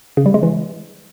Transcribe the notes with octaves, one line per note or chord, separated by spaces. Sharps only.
C#3
G3
G#3
E3